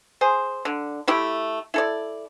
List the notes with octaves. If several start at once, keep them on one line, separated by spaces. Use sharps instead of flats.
G#4 C5
D3
A3 E4 G4
E4 A4 D5